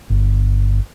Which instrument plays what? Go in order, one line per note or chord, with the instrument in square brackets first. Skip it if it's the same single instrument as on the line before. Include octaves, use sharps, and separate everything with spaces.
[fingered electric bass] G1